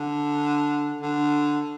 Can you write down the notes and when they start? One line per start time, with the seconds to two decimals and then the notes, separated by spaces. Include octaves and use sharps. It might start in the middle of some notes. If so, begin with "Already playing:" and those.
Already playing: D3
1.01 D3